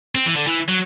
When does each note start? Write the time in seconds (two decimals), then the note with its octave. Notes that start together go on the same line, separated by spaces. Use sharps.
0.15 C4
0.26 E3
0.36 D3
0.47 E3
0.68 F#3